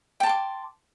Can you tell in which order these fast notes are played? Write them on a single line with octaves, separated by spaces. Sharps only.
G5 A5 C6 D6